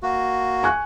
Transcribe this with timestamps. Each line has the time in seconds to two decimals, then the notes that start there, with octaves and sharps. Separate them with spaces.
0.03 A#3 F#4
0.63 G#5 C#6 F#6